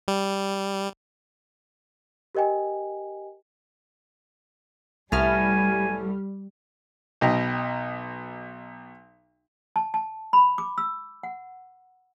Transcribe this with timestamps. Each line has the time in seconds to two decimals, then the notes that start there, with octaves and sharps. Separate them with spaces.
0.08 G3
2.35 G4 A#4 D#5 G5 G#5
5.12 C2 A2 G3 A3 B3 G#5 F6
7.21 B1 B2 D#5 G5 A#5
9.76 A5
9.94 A5
10.33 B5
10.58 D6
10.78 E6
11.23 F#5